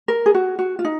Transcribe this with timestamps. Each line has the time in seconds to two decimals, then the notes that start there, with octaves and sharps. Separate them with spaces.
0.08 A#4
0.26 G#4
0.35 F#4
0.59 F#4
0.79 F4
0.85 D#4